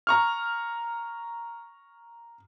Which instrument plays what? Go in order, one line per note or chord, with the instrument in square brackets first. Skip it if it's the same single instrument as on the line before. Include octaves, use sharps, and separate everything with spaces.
[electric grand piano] A#5 C#6 F6